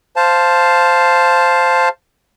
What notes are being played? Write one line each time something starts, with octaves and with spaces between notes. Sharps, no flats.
C5 F5 A5